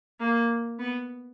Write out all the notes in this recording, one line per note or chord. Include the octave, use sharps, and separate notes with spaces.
A#3
B3